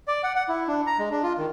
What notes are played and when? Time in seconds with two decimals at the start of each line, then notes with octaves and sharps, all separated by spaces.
0.08 D5
0.23 F#5
0.35 F#5
0.49 E4
0.68 D4
0.87 A#5
0.99 G#3
1.11 D4
1.23 F4
1.38 D#3